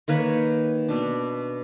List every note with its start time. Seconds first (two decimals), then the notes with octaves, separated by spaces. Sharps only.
0.08 D#3 A#3 B4 C#5
0.89 B2 D4